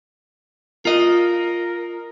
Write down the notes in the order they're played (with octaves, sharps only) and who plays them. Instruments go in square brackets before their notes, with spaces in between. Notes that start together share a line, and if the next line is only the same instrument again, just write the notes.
[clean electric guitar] F4 D#5 [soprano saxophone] A#4